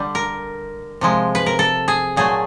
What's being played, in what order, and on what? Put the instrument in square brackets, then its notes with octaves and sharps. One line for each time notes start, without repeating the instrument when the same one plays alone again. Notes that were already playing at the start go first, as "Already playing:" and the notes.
Already playing: [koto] D3 G3
A#4
C3 F3 G#3
B4
A#4
A4
G#4
A#2 F#3 A3 G#4